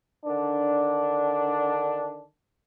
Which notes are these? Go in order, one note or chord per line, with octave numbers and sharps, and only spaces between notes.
D3 D#3 D4